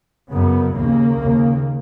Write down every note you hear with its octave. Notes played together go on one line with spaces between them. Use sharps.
F#2 C#3 B3
D#2 C#3 A#3
D#2 C#3